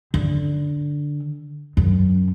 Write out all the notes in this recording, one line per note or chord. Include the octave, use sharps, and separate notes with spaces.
D3
F#2